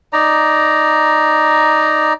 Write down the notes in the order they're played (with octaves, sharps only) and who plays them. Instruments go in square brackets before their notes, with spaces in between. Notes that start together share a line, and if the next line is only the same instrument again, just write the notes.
[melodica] D#4 D5 A#5